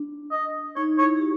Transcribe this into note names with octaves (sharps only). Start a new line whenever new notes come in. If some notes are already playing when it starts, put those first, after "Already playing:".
Already playing: D4
D#5
D#4 C#5
E4 C#5
G4
F#4